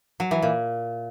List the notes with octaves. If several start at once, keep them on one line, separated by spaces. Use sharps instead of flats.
F#3
E3
A#2